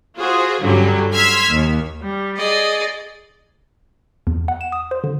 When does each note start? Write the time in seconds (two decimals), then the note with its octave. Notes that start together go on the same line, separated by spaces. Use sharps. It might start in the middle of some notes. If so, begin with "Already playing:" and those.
0.16 F4 F#4 G#4 C5
0.61 G2 D3 F#3 G3 C#4
1.14 C6 E6 F6 G#6 B6
1.50 D#2
2.02 G3
2.37 G#4 D5 D#5
4.27 E2
4.48 F#5
4.61 E7
4.72 D#6
4.91 C5
5.04 D3